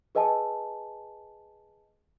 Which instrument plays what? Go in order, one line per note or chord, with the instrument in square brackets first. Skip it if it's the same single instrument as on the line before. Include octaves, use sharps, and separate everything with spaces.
[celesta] G#4 B4 D#5 G#5 A5